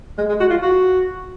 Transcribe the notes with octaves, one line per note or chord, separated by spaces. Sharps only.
G#3
G#3
F#4
F4
F#4